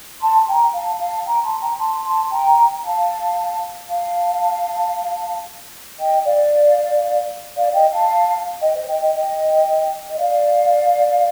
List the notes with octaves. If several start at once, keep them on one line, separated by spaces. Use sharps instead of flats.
A5 C6
G5 A#5
F5 A5
F5 A5
G5 A#5
A5 C6
G5 A#5
A5 C6
A5 C6
G5 A#5
F5 A5
F5 A5
D#5 G5
D5 F5
D5 F5
D#5 G5
F5 A5
D#5 G5
C5 D#5
D#5 G5
D#5 G5
D#5 G5
D#5
D5 F5